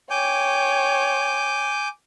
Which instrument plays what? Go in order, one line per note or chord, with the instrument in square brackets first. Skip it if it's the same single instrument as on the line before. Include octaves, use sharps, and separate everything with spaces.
[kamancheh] C#5 G5 [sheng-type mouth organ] G#5 D6 G6